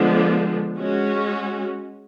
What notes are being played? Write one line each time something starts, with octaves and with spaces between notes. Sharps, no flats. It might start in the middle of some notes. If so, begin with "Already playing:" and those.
Already playing: D3 F3 G#3 B3 D4
G#3 C#4 F#4